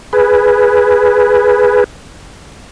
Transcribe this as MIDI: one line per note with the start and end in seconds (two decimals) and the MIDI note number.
0.13 1.84 68
0.13 1.84 71